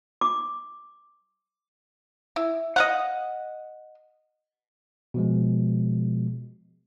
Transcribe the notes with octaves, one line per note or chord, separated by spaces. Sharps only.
D6
E4
D#5 F5 F#5
B2 F3 G#3